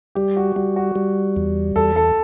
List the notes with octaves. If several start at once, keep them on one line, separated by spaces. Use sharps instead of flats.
G3 G4
F#4
G3 F#4
F#4
G3
E2
E2 A4
A4